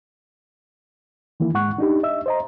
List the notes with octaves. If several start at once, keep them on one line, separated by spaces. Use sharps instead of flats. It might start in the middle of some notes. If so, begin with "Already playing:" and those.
D#3 E3 A#3 E4
G#2 G#3 F#5 C#6 F#6
D4 D#4 G4
D#5 E5 E6
C5 D#5 A#5